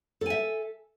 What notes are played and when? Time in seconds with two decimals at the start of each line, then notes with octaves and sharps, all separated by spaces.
0.21 A4
0.26 G#5
0.30 E5